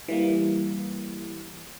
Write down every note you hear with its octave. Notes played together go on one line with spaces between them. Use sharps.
E3 G3 A#3